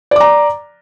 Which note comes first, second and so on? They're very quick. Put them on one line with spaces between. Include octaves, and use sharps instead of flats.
D5 D6 A#5